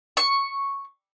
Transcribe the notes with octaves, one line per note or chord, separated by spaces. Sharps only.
C#6